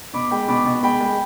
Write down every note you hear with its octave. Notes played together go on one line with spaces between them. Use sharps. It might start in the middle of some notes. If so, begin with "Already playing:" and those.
B2 B5 D6
G#3 G5 B5
B2 B5 D6
B2
G#3 G5 B5
G#3